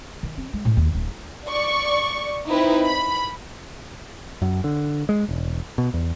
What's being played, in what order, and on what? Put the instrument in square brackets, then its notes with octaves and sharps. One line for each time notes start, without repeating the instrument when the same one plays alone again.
[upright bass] D#3
C4
G#3
A2
D#2
D1
[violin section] D5 C#6
C4 D#4 E4 B4
B5
[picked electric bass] F#2
D3
G#3
E1
B2
E2